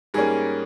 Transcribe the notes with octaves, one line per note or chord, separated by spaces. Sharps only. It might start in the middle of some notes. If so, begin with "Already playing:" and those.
G#2 G3 A#3 C#4 G#4